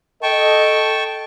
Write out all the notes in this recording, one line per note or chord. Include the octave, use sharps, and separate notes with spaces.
A4 D#5 G5 A5 C#6